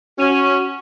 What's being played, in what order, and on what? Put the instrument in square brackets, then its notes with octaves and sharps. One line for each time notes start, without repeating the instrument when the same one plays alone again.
[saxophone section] C#4 [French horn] F#4